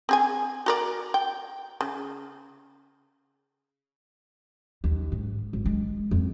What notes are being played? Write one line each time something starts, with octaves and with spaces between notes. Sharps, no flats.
C4 G#4 G#5
F#4 A#4 D5
G5
C#3
D#2
G#2
G#1
G#3
F2